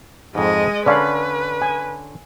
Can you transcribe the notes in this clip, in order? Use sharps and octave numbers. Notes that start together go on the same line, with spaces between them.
F2 G#2 G#3 D#5
D3 C#4 B4 D5 F5 B5
G#5